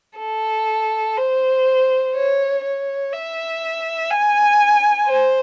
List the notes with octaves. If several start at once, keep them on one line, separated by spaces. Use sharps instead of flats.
A4
C5
C#5
C#5
E5
G#5
C5